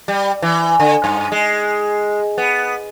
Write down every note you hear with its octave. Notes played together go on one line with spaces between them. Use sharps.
G3
E3
D3
G2
G#3
B3